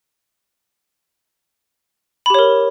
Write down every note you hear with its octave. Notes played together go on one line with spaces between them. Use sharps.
G4 A#4 C#5 B5